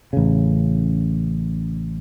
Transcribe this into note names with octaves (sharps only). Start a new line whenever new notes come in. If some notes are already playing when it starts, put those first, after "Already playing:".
A1 C#3